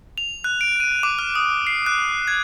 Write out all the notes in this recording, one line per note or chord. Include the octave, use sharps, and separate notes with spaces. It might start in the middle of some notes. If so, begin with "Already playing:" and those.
F7
F#6
D7
D#7
D6
F6
D#6
C7
F#6
G#6